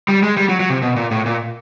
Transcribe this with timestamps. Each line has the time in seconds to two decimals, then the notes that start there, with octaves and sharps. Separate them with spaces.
0.08 G3
0.23 G#3
0.37 G3
0.49 F#3
0.60 F#3
0.70 C3
0.82 B2
0.96 A#2
1.11 A2
1.26 A#2